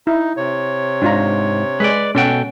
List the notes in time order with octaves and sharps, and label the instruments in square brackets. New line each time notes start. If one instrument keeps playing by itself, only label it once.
[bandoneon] D#4 [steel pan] E4
[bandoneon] C3 C#5
[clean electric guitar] G#2 [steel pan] D4 F4 A#5
[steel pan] G#3 [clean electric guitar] B4 D5
[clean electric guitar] B2 A4 G5 [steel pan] C#4 F#5